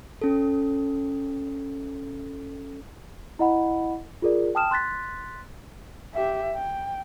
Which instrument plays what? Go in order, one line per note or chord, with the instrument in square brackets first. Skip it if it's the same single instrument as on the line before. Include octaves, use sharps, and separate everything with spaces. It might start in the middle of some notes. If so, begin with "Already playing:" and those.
[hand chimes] C#4 A4
[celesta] E4 D#5 F#5 B5
F4 G#4 A#4 D5
G5 A5 D#6 F6 E7
C6 F#6 A6 B6
[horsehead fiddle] G4 E5
G5